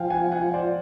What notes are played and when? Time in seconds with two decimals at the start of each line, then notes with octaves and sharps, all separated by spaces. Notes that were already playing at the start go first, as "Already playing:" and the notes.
Already playing: F3 F5 G5 G#5
0.10 F#5 G#5
0.32 F#5 G#5
0.54 C5 D5